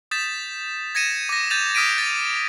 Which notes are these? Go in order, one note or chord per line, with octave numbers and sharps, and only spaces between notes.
D#6 G6 A6 B6 E7
G#6 A#6 C#7 D#7 E7
D6 A#6
G6 A6 D#7 F7
D#6 F6 B6 D7 D#7
G6 A6